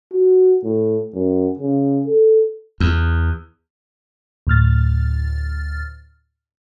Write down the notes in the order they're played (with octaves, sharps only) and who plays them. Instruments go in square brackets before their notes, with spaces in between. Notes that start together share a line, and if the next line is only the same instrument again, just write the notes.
[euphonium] F#4
A2
F#2
C#3
A4
[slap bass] E2
[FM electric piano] D2 A2 F6 A6